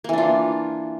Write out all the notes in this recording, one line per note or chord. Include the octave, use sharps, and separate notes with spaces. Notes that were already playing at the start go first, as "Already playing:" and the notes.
E3 A#3 D4 F4